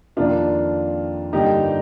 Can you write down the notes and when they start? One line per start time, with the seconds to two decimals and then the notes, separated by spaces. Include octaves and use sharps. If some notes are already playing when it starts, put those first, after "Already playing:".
0.16 F2 D#3 A#3 D4 F4
1.33 G2 D3 G3 A#3 D#4 G4